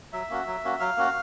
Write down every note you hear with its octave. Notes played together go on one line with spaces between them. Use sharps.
F#3 E5
A#3 C#4 F#4
F#3
A#3 C#4 F#4
F#3 F5
A#3 C#4 F#4